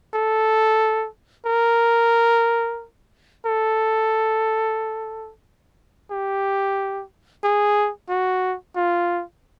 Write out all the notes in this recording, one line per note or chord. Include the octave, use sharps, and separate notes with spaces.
A4
A#4
A4
G4
G#4
F#4
F4